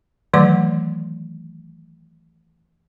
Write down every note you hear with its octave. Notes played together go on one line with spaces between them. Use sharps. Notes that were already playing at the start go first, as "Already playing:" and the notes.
D#3 E3 F#3 A3 D5 D6